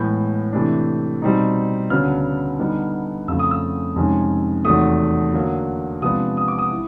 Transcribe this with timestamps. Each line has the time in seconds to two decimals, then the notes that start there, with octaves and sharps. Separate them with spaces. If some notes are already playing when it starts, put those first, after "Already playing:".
Already playing: A2 E3 G#3 B3 G6
0.53 C3 E3 A3 D4
1.22 B2 G3 C4 D#4
1.90 D2 C#3 F#3 B3 D4 F6
2.59 D3 G3 B3 D#4
3.28 F2 C#3 F3 A3 E6
3.39 D#6
3.51 E6
3.96 F2 C3 D#3 G#3 C#4
4.65 E2 C3 D#3 F#3 A3 D#6
5.34 D3 F#3 A#3
6.02 C3 F3 G#3 B3 D4 D#6
6.37 D#6
6.48 D6
6.59 D#6
6.71 E4